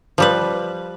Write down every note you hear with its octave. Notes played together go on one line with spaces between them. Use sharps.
F3 G3 B4